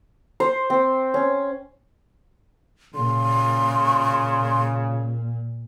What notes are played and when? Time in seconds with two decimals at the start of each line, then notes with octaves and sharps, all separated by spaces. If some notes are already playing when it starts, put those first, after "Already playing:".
0.40 C5
0.70 C4
1.14 C#4
2.95 A#2 C#3 C6